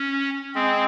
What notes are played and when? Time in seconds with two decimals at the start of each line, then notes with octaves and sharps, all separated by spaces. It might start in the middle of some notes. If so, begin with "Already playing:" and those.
Already playing: C#4
0.55 G#3 C4